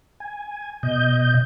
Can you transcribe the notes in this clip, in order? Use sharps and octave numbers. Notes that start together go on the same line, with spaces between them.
G#5
B2 D#5 G6